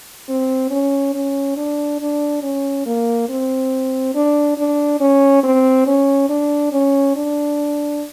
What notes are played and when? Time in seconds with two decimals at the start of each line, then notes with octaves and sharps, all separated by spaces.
0.29 C4
0.71 C#4
1.14 C#4
1.57 D4
2.01 D4
2.43 C#4
2.86 A#3
3.29 C4
4.15 D4
4.58 D4
5.01 C#4
5.44 C4
5.87 C#4
6.30 D4
6.72 C#4
7.16 D4